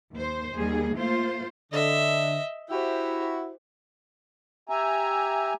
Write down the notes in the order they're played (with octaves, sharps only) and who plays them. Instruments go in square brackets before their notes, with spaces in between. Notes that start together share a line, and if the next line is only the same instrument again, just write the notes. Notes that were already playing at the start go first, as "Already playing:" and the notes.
[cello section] D#2 C5
D#2 G3 G#4
A3 A#3 F4 C5
[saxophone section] D3 [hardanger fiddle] D#5 E5
[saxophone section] E4 F#4 [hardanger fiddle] G4 C5
[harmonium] G4 E5 G#5 A#5